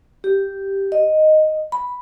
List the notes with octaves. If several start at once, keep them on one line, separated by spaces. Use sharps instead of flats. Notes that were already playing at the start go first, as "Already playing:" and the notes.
G4
D#5
B5